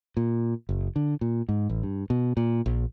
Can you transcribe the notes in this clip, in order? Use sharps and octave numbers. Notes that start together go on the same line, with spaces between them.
A#2
F#1
D3
A#2
G#2
A1
G2
B2
A#2
A#1